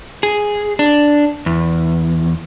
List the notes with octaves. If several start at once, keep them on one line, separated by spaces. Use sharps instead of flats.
G#4
D4
E2